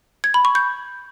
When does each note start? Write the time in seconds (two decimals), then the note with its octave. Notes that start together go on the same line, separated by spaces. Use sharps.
0.24 G#6
0.34 B5
0.45 C#6
0.55 G6